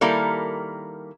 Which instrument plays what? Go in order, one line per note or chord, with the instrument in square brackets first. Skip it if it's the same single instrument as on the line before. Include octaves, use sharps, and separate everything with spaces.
[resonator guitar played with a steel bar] D#3 G3 A#3 E4 A4 A#4